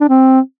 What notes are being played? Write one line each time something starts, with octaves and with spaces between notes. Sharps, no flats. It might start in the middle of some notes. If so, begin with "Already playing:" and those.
D4
C4